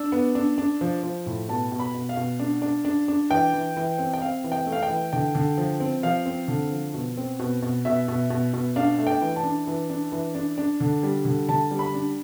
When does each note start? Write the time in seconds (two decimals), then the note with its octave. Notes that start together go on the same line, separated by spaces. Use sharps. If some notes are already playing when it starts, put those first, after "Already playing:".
Already playing: D4 E6
0.12 B3
0.35 D4
0.58 D4
0.81 F3
1.03 F3
1.26 A2
1.49 B2 A5
1.72 B2
1.80 B5
1.94 B2
2.09 F5
2.17 B2
2.40 D4
2.62 D4
2.85 D4
3.08 D4
3.30 E3 G5
3.53 E3
3.77 E3
3.98 C4
4.14 G5
4.21 C4 F5
4.44 E3
4.52 G5
4.66 A3
4.72 F5
4.83 G5
4.89 E3
5.13 D3 G5
5.35 D3
5.58 F3
5.80 C4
6.03 F3 F5
6.26 C4
6.48 D3
6.71 F3
6.94 B2
7.17 C4
7.39 B2
7.62 B2
7.85 B2 E5
8.08 B2
8.30 B2
8.53 B2
8.76 D4 F5
8.98 A3
9.07 G5
9.21 E3
9.36 A5
9.44 D4
9.67 E3
9.90 D4
10.12 E3
10.35 D4
10.58 D4
10.80 D3
11.03 G3
11.25 D3
11.48 D3 A5
11.71 G3
11.79 B5
11.94 D4